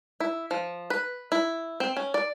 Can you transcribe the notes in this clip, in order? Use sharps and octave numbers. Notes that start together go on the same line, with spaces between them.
E4
F3
B4
E4
C4
C#4
D5